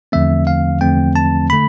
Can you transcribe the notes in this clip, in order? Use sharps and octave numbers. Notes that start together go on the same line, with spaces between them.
E2 D3 F3 A3 C4 E5
F5
E2 D3 F3 A3 C4 G5
A5
D3 A3 B5